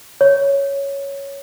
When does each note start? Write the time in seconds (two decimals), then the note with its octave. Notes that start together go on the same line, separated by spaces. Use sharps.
0.21 C#5